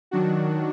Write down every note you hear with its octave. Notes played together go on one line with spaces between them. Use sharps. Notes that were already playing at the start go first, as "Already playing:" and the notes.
D#3 F#3 D4 F#4